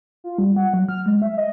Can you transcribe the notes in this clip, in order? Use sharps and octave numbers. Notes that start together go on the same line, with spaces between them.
F4
G3
F#5
F#3
F6
G#3
E5
D#5